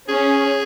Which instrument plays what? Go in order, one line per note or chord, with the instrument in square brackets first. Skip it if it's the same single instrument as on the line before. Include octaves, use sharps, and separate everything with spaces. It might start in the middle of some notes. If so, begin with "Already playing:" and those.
[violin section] C#4 [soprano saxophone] G#4